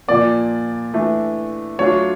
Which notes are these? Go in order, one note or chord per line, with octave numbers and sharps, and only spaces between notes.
A#2 F3 A#3 D5
E3 A3 D4
F#3 A3 D4 F4 C#5